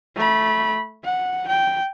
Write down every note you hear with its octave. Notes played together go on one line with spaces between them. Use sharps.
A3 B5
F#5
G5